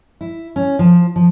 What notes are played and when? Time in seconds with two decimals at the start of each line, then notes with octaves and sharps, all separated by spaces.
0.21 E4
0.56 C#4
0.79 F3
1.16 F3